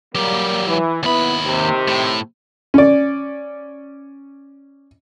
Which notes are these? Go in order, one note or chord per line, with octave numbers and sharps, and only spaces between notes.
F#3 G3 A#3 G4
E3
D#2 B3 E4 B5
C3 D#3
A2
C#4 D5